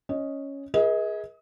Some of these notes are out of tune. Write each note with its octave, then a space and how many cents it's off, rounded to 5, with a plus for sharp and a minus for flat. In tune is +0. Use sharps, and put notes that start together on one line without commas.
C#4 +0 D#5 +0
G#4 +0 B4 -45 D#5 +40